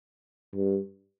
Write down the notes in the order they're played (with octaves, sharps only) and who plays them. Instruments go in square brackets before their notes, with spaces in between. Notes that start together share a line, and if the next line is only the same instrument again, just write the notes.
[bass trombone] G2